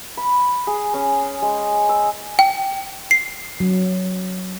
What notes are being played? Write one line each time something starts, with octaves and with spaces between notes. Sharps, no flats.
B5
G#4
C#4
G#3
E6
G5
C7
F#3